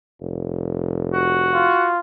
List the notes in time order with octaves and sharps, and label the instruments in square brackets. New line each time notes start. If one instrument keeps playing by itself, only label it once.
[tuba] F1
[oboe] F#4
[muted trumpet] F4